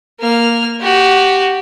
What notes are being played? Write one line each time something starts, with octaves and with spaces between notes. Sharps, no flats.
A#3 F6
F#4 G4